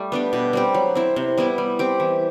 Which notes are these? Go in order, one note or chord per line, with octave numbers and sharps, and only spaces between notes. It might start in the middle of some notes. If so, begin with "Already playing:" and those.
Already playing: G3 A3
B3 D4 G4
B2
G3 C4 G4
F#3
C4 E4
C3
G3 B3 E4
G3
C4 G4
E3